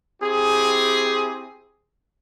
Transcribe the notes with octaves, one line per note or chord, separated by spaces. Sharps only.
C4 E4 G4 G#4